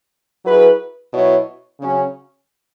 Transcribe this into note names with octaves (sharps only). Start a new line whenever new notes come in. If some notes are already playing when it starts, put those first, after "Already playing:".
F#3 E4 G#4 B4
B2 F#3 E4 C#5
C#3 F#3 C#4